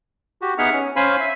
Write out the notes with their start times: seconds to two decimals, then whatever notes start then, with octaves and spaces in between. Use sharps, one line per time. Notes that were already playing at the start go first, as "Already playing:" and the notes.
0.42 F#4 G4
0.58 B3 D#4 G#4 E5 F#5 F6
0.73 C#4
0.96 C#4 C5 F5 G#5 B5
1.20 E5